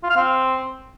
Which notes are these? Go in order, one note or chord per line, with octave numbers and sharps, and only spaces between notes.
F4
F5
C4